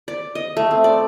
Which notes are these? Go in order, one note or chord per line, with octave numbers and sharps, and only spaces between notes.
D5
D#5
A3
C4
D5